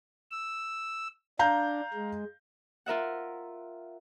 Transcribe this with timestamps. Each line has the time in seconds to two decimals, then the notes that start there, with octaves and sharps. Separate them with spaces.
0.31 E6
1.39 D4 F5 A#5 G6
1.93 G#3
2.86 F4 A#4 E5 F#5